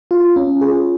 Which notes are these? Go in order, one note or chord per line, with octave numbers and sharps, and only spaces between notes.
F4
C#4
G#4